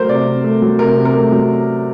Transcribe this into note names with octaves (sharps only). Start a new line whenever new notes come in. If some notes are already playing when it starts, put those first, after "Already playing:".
Already playing: F#3 A3 A#4 C5
C3 D5
C3
A3
F#3
C3 A#4
C3
A#4
A3
F#3